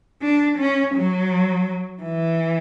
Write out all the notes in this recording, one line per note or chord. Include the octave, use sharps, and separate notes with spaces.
D4
C#4
F#3
E3